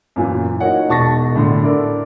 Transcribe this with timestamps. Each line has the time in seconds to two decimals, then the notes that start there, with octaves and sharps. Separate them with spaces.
0.16 F#2 A#2 E3
0.60 D#4 F4 F#4 A#4 C#5 F#5
0.89 E1 D#4 A5 C#6 A6 A#6
1.35 A2 D3 C6
1.62 D4 E4 A4 A#4